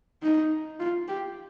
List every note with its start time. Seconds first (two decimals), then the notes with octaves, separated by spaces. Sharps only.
0.23 D#4
0.79 F4
1.08 G4